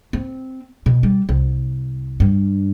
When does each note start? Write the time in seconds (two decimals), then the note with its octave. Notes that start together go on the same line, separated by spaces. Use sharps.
0.13 C4
0.86 B2
1.03 G3
1.29 C2
2.20 G2